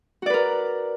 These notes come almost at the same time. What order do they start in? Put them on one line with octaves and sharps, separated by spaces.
F#4 D5 B4 A#4